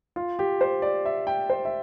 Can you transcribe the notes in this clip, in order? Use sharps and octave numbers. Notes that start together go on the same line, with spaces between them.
F4
G4
C5
D5
E5
G5
C5
E5